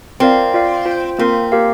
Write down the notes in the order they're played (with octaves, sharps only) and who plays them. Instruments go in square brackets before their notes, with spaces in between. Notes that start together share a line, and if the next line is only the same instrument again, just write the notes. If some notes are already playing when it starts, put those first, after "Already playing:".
[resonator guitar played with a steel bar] C4 [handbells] F4 A#4 D5 F5
[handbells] F4 D5 F5
F4 C5 G5
[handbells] A#3 F4 A#4 [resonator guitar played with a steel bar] C4
[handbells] A#3 G4 A#4 F5